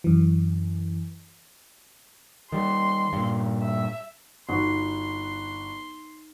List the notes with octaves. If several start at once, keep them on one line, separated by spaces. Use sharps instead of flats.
F#2 E3
D#3 G3 C6
G2 A#2
E5
G1 D#4 F#4 C6